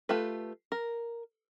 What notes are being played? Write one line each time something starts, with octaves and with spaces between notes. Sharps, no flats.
A3 F4 G4 B4
A#4